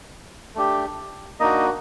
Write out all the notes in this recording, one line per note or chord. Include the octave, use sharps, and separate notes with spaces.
A3 D4 G4
A#3 D4 D#4 F#4 D#5